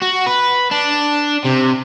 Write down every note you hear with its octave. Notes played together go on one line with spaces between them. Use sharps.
F#4
B4
D4
C3